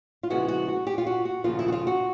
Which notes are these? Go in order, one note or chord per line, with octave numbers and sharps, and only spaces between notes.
F4
C#3 F3 G#3 B3 E4 F#4
F#4
F#4
G4
F4
F#4
F#4
D#2 C#3 F3 A#3 F4
E4
F#4
F4
F#4